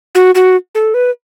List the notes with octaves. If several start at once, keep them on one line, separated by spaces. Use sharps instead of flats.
F#4
F#4
A4
B4